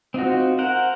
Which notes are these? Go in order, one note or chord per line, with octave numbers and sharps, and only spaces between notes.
C4 D#4 F4 F#4
A#4 C5 F#5